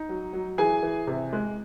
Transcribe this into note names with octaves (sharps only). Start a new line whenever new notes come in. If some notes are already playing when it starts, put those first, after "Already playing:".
Already playing: D#4
F#3
F#3
E3 G#4 G#5
E3
C3
G#3